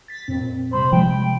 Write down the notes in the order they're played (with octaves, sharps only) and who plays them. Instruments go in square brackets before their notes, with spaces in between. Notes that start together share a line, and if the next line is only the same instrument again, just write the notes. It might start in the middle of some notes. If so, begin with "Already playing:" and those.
[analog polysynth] A6 B6
F2 A#2 C4
[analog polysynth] C3 G3 B5 [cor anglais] C5
[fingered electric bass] F3 G#3 [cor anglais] G5